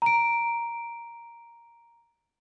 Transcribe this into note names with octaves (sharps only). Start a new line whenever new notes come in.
A#5 D7